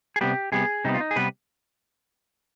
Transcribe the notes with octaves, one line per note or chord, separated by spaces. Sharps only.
G#4
C3 G3 B3 G4
C3 G3 B3 G#4
C3 G3 B3 D#4
F4
D#4
G#4
C3 G3 B3 B4